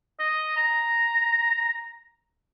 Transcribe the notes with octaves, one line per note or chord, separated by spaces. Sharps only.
D#5
A#5